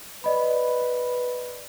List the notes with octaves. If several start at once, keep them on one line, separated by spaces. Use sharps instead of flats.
B4 D5 D#5 B5